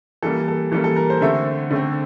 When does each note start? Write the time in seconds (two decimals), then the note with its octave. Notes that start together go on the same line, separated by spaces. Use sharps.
0.22 E3 G3 A#3 A4
0.48 A4
0.72 E3 G3 A#3 A4
0.84 A4
0.96 A#4
1.10 C5
1.21 D3 A3 C4 E5
1.71 D3 A3 C4